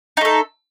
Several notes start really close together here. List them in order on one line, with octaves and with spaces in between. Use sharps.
D#4 A3 A4